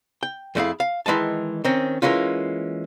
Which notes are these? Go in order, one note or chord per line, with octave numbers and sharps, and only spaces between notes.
G5
F2 A3 C#4 E4 G#4 F5
F5
D#3 E3 G#3 D#5 A5
D#3 C4 C#4
E3 G#3 A#3 C#4 F4